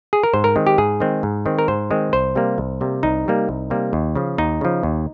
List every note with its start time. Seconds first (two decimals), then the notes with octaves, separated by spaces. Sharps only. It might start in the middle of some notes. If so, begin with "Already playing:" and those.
0.13 G#4
0.23 A#4
0.33 G#2 C5
0.44 A#4
0.56 D#3 G#3 C4
0.67 G4
0.78 G#2 G#4
1.00 D#3 G#3 C4
1.23 G#2
1.46 D#3 G#3 C4
1.59 A#4
1.68 G#2 C5
1.91 D#3 G#3 C4
2.13 C2 C5
2.35 C3 G3 A#3
2.58 C2
2.81 C3 G3 A#3
3.03 C2 D#4
3.26 C3 G3 A#3
3.49 C2
3.70 C3 G3 A#3
3.93 D#2
4.15 C#3 F3
4.38 D#2 D#4
4.61 C#3 F3
4.83 D#2